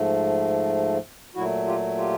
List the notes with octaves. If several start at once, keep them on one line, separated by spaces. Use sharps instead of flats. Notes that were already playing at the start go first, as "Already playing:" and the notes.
Already playing: G#2 F3 A3
A#2 F#3 A3 E4 F#4
F4 G4
F4 G4